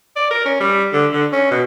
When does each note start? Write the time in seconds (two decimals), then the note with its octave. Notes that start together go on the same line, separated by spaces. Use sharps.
0.16 D5
0.31 A#4
0.45 C#4
0.60 G3
0.93 D3
1.13 D3
1.32 C#4
1.51 B2